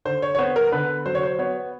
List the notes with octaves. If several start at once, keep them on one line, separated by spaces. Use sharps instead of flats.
D3 C5
C#5
C#5
B3 C5
A#4
D3 B4
F#3 C5
C#5
C5
B3 C#5